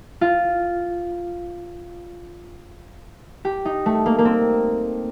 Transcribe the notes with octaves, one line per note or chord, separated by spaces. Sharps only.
F4
G4
D#4
A3
A#3
A#3
C4